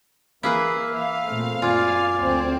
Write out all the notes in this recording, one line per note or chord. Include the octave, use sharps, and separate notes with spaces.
E3 A#3 E4 G#4 B4 F5
E5 F5
A#2 A3 C4
F#2 A#3 F4 D5 G#5
D2 F#3 C4